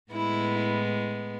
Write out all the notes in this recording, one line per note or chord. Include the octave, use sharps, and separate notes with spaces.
A2 G#3 B3 E4